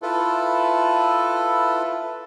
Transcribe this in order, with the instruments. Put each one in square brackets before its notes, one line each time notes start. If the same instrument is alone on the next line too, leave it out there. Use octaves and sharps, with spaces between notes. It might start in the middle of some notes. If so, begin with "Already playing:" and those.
[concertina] E4 F4 A4 B4